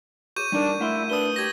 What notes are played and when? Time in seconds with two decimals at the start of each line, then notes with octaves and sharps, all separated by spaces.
0.36 F#4 G#4 C#5 C#6 G6 D#7
0.52 G3 D4 D#4 A#4
0.80 A3 E4 A#4 F5 F#5 C6
1.10 D4 F#4 B4 B5 D#6 G7
1.36 G4 G#6 A#6